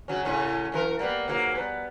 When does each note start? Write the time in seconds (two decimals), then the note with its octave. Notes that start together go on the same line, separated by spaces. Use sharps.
0.08 C#3 F#3 C#4
0.25 A2 C#3 C#4
0.72 F#2 E3 A#4
0.99 G3 A#3 B3
1.28 G#2 F#3 A#3
1.55 G3 B3